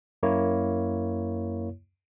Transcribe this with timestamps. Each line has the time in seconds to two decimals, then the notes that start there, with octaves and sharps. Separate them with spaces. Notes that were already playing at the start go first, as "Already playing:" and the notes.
0.23 F#2 A#3 E4 C#5